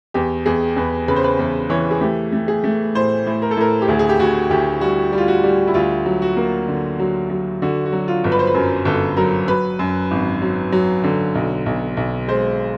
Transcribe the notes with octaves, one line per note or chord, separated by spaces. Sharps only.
E2 G4
E2 G#4
E2 B4
C#3 B4
C5
B4
E2
E3 C#5
G#4
A3 G4
A3
G#4
A3
A2 C5
A2
A#4
A4
A2 A#4
G4
D2 G#4
G#4
G4
D2 F#4
D2 G4
G3 F#4
G3
F4
F#4
G3
E4
D2 F4
F#3
F#4
A#3
D3
F#3
F#3
D3 F#4
F#4
F#3
F4
G1
B4
C5
B4
F#2 A#4
G1 A4
F#3 A#4
F#3 B4
F#2
G#1
F#3
F#3
D3
B1
B1
B1
G#3 C5